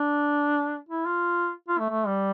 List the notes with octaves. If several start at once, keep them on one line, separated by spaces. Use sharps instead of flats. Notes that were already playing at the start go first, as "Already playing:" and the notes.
Already playing: D4
E4
F4
F4
A3
A3
G3